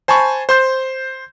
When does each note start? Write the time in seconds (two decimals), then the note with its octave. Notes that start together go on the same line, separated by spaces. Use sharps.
0.08 C5 G#5 A5 B5 C#6
0.49 C5 C6 G6